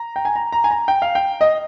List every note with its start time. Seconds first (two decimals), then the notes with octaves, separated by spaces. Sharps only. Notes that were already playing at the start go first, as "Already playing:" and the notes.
Already playing: A#5
0.16 G5
0.25 G#5
0.36 A#5
0.52 A#5
0.64 G#5
0.71 A#5
0.88 G5
1.02 F5
1.15 G5
1.41 D#5